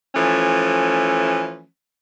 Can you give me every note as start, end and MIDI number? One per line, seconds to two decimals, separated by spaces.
0.15 1.65 52
0.15 1.65 53
0.15 1.65 57
0.15 1.65 61